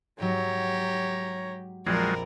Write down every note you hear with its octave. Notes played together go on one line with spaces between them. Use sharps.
G#2 F#3 G4 C#5 A#5
A#1 F2 F3 F#3 G#3 C4 A#4 D5